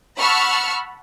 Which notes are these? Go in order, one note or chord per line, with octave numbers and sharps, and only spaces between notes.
F#5 A5 B5 C#6 E6 F6